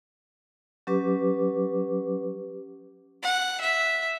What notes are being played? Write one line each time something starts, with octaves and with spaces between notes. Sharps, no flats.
F#3 C#4 G4 B4 D6
F#5
E5